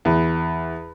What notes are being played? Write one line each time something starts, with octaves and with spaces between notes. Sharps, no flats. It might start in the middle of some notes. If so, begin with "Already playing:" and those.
E2